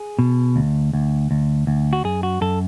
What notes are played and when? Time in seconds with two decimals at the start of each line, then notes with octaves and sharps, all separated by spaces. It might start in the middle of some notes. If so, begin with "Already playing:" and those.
Already playing: G#4
0.19 B2
0.56 D2
0.93 D2
1.31 D2
1.67 D2
1.93 F#4
2.04 F#2 G#4
2.23 F#4
2.41 F#2 A4